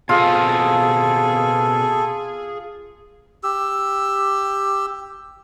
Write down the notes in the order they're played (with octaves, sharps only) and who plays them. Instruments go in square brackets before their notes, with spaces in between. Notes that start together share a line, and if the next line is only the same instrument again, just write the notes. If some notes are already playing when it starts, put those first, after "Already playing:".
[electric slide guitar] B2 C4 D#5 [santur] F4 [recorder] G#4 [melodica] A4
[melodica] G4 E6